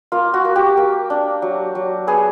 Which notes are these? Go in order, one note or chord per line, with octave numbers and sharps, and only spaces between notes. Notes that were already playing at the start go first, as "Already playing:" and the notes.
A#3 F4
F#4
A#3
G4
A#3
D4
F#3
F#3
B3 G#4